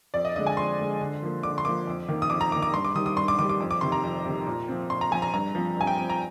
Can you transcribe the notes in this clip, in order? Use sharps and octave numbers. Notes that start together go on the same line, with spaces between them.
F2 D5
D#5
D3 G#3 D#5
G#5
F2 C6
D3 G#3
D3
F3 A#3
D3 D6
C6
F3 A#3 D6
F2
D#3 A#3
D#6
F2 D6
A#5
D#3 A#3 D6
D6
G2 C6
D6
D#3 G3 D#6
D#6
G2 C6
D6
D#3 G3 D6
D6
F2
D6
C3 D#3 C6
A#5
F2
C3 D#3
A#2
F3 C4
A#2 C6
A#5
F3 C4 G#5
A#5
G2 A#5
F3 C4
G2 G#5
G5
F3 C4
A#5